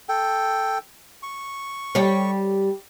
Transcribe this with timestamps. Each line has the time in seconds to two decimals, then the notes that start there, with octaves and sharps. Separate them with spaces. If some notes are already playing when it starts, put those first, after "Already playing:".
0.09 A4 G5
1.23 C#6
1.95 G3 G4 C#5